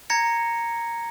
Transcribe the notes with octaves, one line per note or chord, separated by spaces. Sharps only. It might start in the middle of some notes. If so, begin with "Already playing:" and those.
A#5 G#6 A#6 C#7